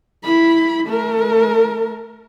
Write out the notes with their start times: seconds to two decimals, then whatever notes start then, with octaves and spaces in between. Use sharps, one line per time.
0.24 E4 B5
0.87 A3 A#4